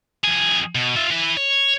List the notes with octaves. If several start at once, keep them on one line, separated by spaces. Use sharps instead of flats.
F2 G#4
B2
F4 E5
E3 B4
C#5